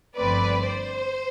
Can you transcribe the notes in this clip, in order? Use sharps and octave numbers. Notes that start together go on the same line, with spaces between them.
G1 G2 F3 A3 C4 B4 D5
C5